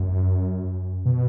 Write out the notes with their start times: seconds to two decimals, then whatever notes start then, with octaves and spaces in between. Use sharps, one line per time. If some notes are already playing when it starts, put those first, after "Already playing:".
Already playing: F#2
1.05 B2